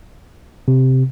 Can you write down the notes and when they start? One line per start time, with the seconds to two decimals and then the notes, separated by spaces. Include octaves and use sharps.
0.68 C3